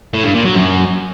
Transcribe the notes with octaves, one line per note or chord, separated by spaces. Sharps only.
A2
G2
A#2
F#3
F#2